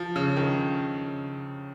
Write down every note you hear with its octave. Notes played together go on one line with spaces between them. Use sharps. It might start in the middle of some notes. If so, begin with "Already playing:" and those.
Already playing: F3
C#3
D#3